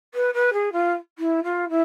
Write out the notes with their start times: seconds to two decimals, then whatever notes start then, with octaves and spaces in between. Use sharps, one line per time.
0.14 B4
0.34 B4
0.53 G#4
0.72 F4
1.18 E4
1.43 F4
1.69 E4